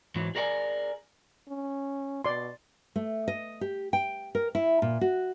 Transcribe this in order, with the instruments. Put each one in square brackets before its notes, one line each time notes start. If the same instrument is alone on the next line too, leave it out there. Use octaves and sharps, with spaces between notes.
[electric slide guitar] G#2 E3 F#3
G#4 A#4 D5 F5 G#5
[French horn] C#4
[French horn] B2 [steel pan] D5 C6
[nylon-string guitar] A3
D#5
G4
G5
A#4
E4
A#2
F#4